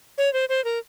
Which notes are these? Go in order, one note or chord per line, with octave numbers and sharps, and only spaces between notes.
C#5
C5
C5
A#4